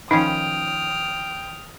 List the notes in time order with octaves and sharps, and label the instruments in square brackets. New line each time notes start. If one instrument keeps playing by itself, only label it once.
[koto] D#3 F3 C#4 [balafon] D#4 [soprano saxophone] G5 [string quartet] D#6 F6